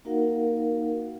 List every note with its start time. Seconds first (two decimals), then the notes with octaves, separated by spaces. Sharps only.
0.05 A#3 D#4 F#4 A#4 F5 F#5